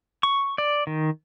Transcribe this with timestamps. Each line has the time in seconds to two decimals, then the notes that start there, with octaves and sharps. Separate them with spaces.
0.23 C#6
0.58 D5
0.87 D#3